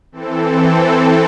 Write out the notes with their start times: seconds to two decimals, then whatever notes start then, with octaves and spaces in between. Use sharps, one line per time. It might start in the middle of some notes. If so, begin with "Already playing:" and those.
0.12 E3 C4 A4